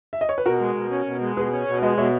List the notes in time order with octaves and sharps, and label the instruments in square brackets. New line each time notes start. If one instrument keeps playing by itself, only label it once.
[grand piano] E5
D#5
C#5
B4
[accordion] B2 [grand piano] F#4 A#4
[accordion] G#3
B2
C#4
B2
G#3
[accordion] B2 [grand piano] G#4 B4
[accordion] C#4
B2
[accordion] G#3 [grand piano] B4 D#5
[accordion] B2 [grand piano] C#5 E5